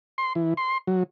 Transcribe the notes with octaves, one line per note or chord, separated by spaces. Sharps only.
C6
E3
C6
F#3